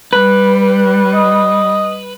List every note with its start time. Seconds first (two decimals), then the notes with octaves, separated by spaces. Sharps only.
0.13 G3 B4
1.14 D#5